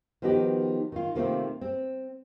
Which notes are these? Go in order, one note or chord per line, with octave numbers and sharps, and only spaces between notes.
D#3 F3 B3 D#4 F#4 G4
D#3 F4
C3 D#3 A3 A#3 C4 F4
C4